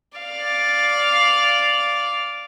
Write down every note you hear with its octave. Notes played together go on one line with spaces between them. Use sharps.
D5 F5